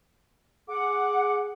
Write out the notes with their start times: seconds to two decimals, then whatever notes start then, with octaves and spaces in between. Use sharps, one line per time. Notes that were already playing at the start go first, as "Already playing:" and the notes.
0.69 G#4 F#5 D6